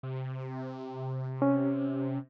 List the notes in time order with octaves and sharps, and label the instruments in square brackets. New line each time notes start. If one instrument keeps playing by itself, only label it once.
[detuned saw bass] C3
[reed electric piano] C#4